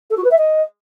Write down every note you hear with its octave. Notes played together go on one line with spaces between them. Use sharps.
A4
F#4
B4
E5
D#5